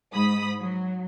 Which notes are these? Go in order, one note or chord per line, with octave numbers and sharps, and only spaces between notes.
G#2 B5 D#6
F#3